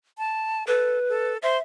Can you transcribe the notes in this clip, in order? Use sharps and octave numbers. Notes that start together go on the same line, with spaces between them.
A5
A4 B4
A4
C5 E5